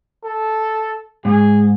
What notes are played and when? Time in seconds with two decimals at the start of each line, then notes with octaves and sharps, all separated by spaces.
0.24 A4
1.25 G#2 G#4